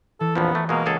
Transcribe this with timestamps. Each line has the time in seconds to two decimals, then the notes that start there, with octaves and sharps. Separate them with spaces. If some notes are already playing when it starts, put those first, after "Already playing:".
0.20 E3 A4
0.35 A#1 F2 F3 B3 E5 A#5
0.55 A3
0.69 B2 G#3 A#3
0.86 C#2 G#4 A4 F#5